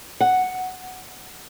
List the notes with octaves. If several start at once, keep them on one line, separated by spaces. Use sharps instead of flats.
F#5